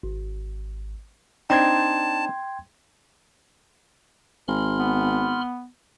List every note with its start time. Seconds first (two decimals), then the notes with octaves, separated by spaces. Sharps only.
0.03 G#1
1.50 C4 D4 D#4 G5 A5 C6 G#6
4.48 G#1 B5 C6 F6
4.79 B3